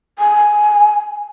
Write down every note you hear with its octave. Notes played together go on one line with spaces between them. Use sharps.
G#5